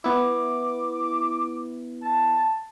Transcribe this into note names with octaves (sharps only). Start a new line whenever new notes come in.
B3 E4 D6
A5